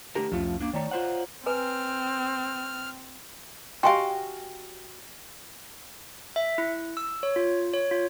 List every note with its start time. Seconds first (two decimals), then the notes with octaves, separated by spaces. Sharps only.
0.15 D3 A3 D4 G4 A#4
0.32 C2 F2 F3 A3 C#4 F4
0.60 A#3 D4
0.73 D#3 A3 D#4 C#5 D5 A#5
0.91 F4 C5 F#5
1.46 C4 B4 G#5 A#5 F6
3.83 F#4 G4 D#5 F5 G5 G#5 C6
6.36 E5
6.58 E4
6.97 E6
7.23 C#5
7.36 F4
7.74 C#5
7.91 F4